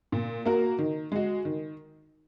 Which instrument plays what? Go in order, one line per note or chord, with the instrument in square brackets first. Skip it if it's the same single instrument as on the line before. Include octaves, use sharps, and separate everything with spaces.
[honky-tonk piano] A#2
A#3 F#4 A#4
D#3
G#3 F#4
D#3